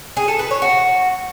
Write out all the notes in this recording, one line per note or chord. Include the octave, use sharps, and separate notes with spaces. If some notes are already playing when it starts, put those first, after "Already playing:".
G#4
A4
B4
C#5
F#4